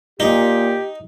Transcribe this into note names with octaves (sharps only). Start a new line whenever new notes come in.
A#2 D#4 G4